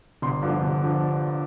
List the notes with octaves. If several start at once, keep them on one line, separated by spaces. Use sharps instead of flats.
G1 C6
G2 D3 F3
G1
D3 F3